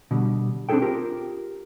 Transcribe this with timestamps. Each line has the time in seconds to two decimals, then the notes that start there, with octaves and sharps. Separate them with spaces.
0.11 B2 D3 G3
0.69 C4 D4 E4 G#4 A4 G5
0.82 F4 G4 A#4